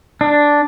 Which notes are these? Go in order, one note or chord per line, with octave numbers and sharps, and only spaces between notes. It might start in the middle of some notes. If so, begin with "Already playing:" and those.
D4